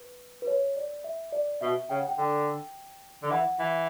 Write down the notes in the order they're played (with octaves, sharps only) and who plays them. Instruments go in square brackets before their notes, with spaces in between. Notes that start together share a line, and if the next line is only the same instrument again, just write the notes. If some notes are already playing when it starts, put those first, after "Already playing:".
Already playing: [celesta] B4
B4
C#5
D5
E5
D5
[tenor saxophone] B2 [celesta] E5
[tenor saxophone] C#3 [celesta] G5
[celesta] F#5
G5
[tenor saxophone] D3 [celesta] G5
[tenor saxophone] D3
[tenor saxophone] E3 [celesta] F#5
[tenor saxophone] E3